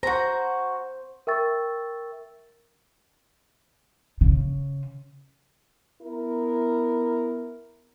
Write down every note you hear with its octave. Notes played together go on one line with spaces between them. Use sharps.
F#4 C5 A#5
A#4 E5 G5 C#6 E6 A6
C#3
B3 E4 A#4